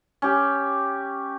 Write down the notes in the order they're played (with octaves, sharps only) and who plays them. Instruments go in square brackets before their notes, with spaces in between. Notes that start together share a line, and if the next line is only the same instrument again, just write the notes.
[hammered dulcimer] C#4 G4